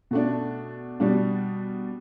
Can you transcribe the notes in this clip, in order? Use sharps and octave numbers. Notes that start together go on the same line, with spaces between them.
B2 A3 D4
B2 G3 D4